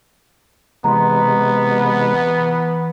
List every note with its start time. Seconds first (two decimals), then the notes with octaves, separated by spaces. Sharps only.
0.84 C3 E3 G#3 B3 A#5 C6